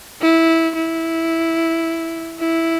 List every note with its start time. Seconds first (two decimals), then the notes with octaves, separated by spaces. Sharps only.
0.22 E4
0.76 E4
2.39 E4